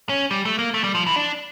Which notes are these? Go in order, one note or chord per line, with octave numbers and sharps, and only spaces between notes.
C#4
G3
A3
A#3
A3
G3
F3
E3
D4